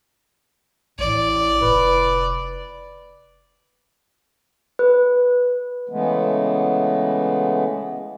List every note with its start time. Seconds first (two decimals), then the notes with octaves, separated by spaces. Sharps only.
0.99 A1 A2 D5
1.62 F1 B4
4.79 B4
5.89 C#3 E3 G#3 A3 B3